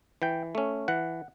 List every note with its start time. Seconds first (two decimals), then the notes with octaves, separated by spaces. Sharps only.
0.22 E3 G5
0.55 A3 C#4
0.88 E3 F#5